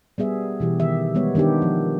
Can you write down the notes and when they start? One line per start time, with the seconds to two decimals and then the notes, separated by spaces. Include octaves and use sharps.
0.18 G3 B3 G#4 E5
0.60 B2 E3 G4
0.80 D#3 G4 E5
1.15 G3 G#3 B3 C#5
1.35 D#3 B3 D4 D#4 G4
1.62 F3